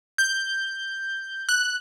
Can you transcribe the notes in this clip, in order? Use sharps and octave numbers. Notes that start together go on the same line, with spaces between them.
G6
F#6